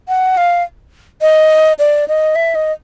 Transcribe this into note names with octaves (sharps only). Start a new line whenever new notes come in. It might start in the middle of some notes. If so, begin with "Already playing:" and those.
F#5
F5
D#5
D5
D#5
E5
D#5